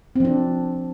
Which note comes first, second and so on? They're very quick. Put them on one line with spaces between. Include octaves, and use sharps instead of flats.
C4 F3 D4